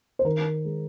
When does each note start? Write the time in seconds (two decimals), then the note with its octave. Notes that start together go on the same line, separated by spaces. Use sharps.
0.19 C5
0.24 D#3 A#4
0.65 G#3